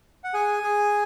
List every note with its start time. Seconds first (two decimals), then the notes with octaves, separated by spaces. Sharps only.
0.24 F#5
0.34 G#4 G#5
0.63 G#4